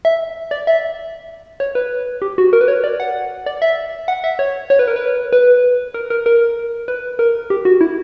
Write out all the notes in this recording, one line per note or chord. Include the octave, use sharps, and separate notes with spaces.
E5
D5
E5
C#5
B4
G4
F#4
A#4
B4
C#5
D5
F#5
D5
E5
F#5
E5
C#5
C#5
B4
A#4
B4
B4
A#4
A#4
A#4
B4
A#4
G4
F#4
E4